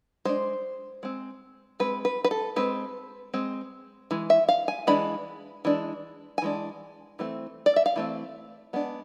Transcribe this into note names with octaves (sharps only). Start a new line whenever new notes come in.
G#3 D4 C5
G#3 C4
G#3 C4 B4
B4
B4
A4
G#3 C4 B4
G#3 C4
E3 G#3
E5
F5
G#5
E3 G#3 D4 B5
E3 G#3 D4
G#5
E3 G#3 D4
E3 A3 C4
D5
E5
F5
E3 A3 C4
G#3 B3 D4